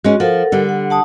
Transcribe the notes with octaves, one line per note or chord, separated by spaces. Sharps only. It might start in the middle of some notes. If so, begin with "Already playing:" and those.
G#3 C#4 F#4
F3 A4 A#4 F#5
D3 G3
F#5
F#5 A5 D#6